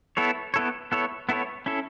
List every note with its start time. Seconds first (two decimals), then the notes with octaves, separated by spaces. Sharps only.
0.17 B3 E4 A4 C#5
0.54 B3 E4 A4 C#5
0.92 B3 E4 A4 C#5
1.29 B3 E4 A4 C#5
1.66 C#4 E4 A4